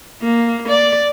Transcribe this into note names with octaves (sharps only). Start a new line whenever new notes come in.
A#3
D5